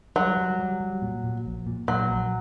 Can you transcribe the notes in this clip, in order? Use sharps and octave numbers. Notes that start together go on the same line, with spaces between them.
F#3 G3
G3
G3
G3
A#2
A#2
A#1
A#2
A#2 F#3
A#1